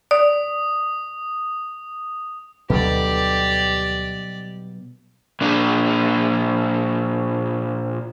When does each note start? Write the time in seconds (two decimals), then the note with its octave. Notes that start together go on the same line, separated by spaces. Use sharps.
0.11 D5 D#6
2.70 D2 B2 D3 F#3 G3 G4 B4 D5
5.41 A#2 D4